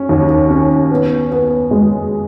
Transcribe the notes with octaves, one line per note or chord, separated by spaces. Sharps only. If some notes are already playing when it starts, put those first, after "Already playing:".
Already playing: C#4
D#2
C#4
B3
B3
G#3